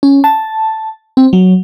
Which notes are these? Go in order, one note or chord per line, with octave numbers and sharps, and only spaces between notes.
C#4
A5
C4
F#3